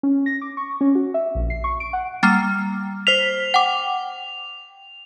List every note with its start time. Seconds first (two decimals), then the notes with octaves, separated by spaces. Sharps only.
0.03 C#4
0.26 A#6
0.41 D6
0.57 C#6
0.81 C#4
0.95 F#4
1.14 E5
1.35 A#1
1.50 C7
1.64 C#6
1.80 D7
1.93 F#5
2.23 G3 A#3 F6 A6
3.07 C5 F6 B6 F7
3.54 F#5 G5 D6